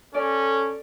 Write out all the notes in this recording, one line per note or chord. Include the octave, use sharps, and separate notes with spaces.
C#4 A4 D5